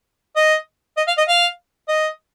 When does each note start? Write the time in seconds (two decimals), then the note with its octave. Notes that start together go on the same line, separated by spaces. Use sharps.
0.36 D#5
0.97 D#5
1.07 F5
1.18 D#5
1.28 F5
1.89 D#5